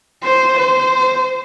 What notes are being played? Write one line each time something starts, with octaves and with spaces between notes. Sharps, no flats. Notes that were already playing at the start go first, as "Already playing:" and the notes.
C5
C5